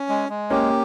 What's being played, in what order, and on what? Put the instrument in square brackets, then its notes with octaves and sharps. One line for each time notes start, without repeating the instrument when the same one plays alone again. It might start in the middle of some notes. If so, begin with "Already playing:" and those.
Already playing: [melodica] C#4
G#3
G#3
[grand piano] A#3 C#4 [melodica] G4